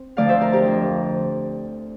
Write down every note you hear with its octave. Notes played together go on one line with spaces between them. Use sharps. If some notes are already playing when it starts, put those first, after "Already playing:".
Already playing: C4
D2 D3 F3 A3 D5 F5
C5 E5
A#4 D5
G4 A#4
F2 D3 F3